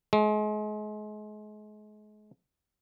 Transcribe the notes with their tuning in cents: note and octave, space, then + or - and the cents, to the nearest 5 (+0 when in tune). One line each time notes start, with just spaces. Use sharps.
G#3 +35